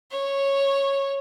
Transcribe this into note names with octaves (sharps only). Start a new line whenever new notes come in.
C#5